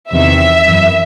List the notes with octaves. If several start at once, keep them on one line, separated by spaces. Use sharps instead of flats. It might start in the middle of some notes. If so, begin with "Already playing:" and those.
E2 C3 D#3 E5
F#2 E3